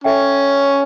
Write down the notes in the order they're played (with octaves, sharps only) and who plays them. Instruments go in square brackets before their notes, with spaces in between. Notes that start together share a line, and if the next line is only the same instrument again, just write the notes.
[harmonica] C#4 [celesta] A4 E5 G5